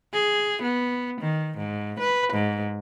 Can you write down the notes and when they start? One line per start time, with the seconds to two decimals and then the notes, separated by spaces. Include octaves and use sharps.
0.13 G#4
0.62 B3
1.21 D#3
1.58 G#2
2.00 B4
2.33 G#2